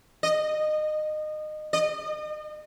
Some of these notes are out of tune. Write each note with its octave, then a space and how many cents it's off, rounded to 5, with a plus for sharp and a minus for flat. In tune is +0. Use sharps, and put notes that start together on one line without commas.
D#5 -25
D#5 -40